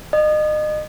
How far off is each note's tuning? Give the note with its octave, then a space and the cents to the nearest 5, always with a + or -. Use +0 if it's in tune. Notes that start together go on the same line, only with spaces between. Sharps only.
D#5 -35